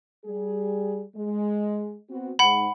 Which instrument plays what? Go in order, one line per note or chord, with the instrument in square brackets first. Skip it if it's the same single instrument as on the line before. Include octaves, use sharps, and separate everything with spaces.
[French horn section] G3 G#4
G#3
B3 C4 F#4
[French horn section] G#2 [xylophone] F#5 B5